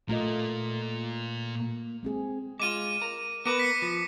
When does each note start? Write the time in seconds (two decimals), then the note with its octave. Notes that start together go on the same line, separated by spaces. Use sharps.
0.09 A#2 A3 A#3 F4 A#4 D#5
2.03 G#3 C4 G#4
2.60 G#3 F4 D6 D#7
3.02 A#4
3.45 B3 A#4 B4 D6 D#7
3.59 B6 C#7
3.82 F3